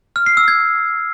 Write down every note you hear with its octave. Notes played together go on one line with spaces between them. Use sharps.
F6
C7
E6
G#6